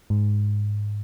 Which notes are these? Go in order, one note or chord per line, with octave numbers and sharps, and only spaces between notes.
G#2